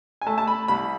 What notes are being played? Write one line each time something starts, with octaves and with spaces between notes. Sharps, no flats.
G#5
A3 A5
A5
B5
C2 B5